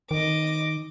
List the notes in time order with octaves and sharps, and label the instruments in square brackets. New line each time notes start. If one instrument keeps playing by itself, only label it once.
[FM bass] D#3 [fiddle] D#5 D6